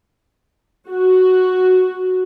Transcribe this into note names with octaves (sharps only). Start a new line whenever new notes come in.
F#4